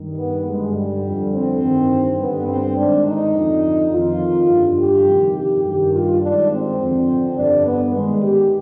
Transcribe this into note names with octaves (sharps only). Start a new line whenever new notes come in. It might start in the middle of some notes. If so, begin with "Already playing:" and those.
Already playing: G2 D#3
B3
G2 D3 G#3
G3
F2 D3
C4
G2 D#3
G2 D3 B3
C4
G#2 D#3 D4
D#4
F2 D3
F2 D#3 F4
G2 D3
G4
F2 C3 D#3
G4
G2 D#3 G4
F4
G#2 D#3 D4
C4
F2 D3
G2 D3 D4
B3
G#2 D#3 G#3
G4